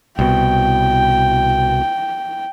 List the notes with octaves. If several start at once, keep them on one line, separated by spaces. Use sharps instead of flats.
C2 B2 G5